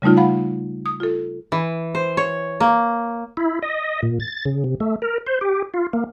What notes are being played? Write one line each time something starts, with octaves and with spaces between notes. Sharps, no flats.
C#3 G3 A3 D#4 F4
F5 F#5 B5
D#6
F4 A4
E3
C5
C#5
A#3
E4
D#5
A#2
A6
C#3
C3
A3
A#4
C5
G4
F4
A#3